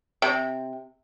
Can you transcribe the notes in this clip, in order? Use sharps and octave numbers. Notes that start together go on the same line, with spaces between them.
C3